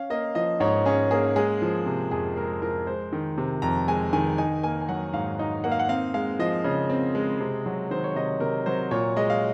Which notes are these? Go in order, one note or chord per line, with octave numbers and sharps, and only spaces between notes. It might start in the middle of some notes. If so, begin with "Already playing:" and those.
Already playing: C#4 F5
A#3 D#5
F3 D#5
G#2 C#5
C#4 G#4
A#3 G#4
G#3 G#4
F3
C3
F2 G#4
G#3 A#4
F3 A#4
G#3 C5
D#3
C3
F2 A#5
G#3 G#5
D#3 G#5
D#4 G#5
A#3 G#5
G#5
F#3 F#5
G#2 F5
D#4
A#3 F#5
F5
F#5
C4 F5
G#3 F5
F3 D#5
C#3
C4
G#3
C3
F#3
D#3 C5
C#5
C3 D#5
C3 A#4
F#3 C5
A#2 C#5
G#3 D#5
F5